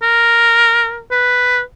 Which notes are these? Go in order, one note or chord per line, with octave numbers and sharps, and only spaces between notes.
A#4
B4